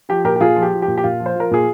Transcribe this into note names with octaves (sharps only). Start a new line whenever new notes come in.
F3 G4
A#2 G4 A#4
G4
A#2 F4 G#4
F3
G4
F3
G4
A#2
G4
A#2 F4
F3
C5
F3 A#4
A#2 G#4